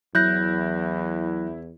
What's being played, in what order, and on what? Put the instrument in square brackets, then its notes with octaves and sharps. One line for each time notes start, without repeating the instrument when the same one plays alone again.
[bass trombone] E2 [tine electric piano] F#3 F#6 A#6 [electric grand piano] E4 [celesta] G6